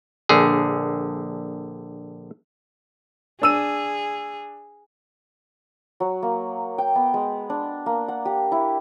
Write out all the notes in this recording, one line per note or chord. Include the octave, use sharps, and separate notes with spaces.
A#1 D3 G#4
D4 G#4 E6 D#7
F#3
A#3
G5
B3
G#3
D4
A#3
F#5
G4
E4